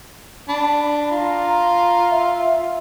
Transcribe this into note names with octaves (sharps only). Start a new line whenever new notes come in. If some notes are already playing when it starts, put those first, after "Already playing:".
D4 B5
F4 A#5
E5